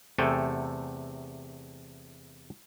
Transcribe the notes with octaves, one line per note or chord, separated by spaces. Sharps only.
E2 C3 A3 A4 G5 G#5